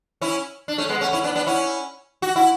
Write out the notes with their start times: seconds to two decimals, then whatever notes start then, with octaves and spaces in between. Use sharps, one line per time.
0.21 C#4 E4
0.68 D4
0.78 A3 C#4
0.89 G#3 B3
1.01 A3 C#4
1.13 C#4 E4
1.24 B3 D4
1.36 B3 D4
1.46 C#4 E4
2.22 F#4
2.36 E4